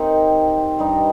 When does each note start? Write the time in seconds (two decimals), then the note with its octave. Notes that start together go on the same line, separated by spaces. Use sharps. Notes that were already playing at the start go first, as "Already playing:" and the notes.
Already playing: D#3 C4 D#4 G4
0.79 G2 G3 D#4